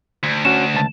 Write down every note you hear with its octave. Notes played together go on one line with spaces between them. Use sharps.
D2
C#4 F#4 E7
C#2 A5